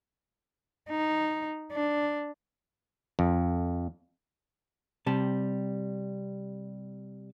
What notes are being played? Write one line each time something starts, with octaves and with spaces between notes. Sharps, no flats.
D#4
D4
F2
C3 G3 A5